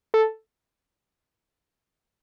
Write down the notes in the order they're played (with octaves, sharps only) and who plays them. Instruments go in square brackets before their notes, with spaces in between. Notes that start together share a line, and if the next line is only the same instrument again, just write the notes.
[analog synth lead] A4